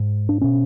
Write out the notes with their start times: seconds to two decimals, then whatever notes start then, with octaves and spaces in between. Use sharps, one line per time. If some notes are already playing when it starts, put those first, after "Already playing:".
Already playing: G#2
0.29 D4
0.41 B2 C#4